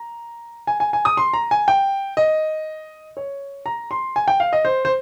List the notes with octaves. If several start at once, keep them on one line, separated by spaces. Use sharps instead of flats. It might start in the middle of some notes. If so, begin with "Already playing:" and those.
Already playing: A#5
G#5
G#5
G#5
D#6
C6
A#5
G#5
G5
D#5
C#5
A#5
C6
G#5
G5
F5
D#5
C5
C5